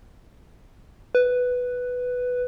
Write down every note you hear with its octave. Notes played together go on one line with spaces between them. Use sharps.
B4